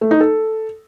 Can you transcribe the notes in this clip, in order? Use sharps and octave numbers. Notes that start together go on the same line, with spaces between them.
A3
D#4
A4